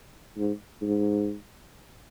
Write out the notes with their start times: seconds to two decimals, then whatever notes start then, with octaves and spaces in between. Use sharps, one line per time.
0.37 G#2
0.82 G#2